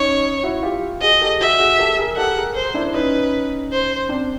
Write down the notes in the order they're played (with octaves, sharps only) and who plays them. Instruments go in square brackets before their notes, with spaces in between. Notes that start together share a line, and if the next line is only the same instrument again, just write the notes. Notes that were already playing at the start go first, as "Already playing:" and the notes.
Already playing: [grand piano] C#4 D#4 [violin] C#5
[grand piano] E4 F#4
F4 G4
[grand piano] F#4 G#4 [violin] D#5
[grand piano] G4 A4
[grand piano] F#4 G#4 [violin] E5
[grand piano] F#4 G#4
G4 A4
G#4 A#4
[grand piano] G4 A4 [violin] F#5
[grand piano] G#4 A#4
[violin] C5
[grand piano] D4 E4
[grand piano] C#4 D#4 [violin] B4
[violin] C5
[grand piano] C4 D4